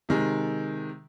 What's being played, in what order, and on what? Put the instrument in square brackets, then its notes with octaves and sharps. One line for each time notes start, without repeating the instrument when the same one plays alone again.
[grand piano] C3 D#3 G#3